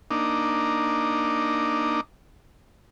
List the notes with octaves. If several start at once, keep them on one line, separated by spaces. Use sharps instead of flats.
A#3 D4 D#4